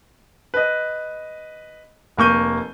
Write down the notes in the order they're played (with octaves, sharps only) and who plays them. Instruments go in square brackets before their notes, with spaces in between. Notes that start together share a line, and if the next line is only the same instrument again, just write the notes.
[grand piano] B4 D#5
F1 A#3 C#6 G6 D#7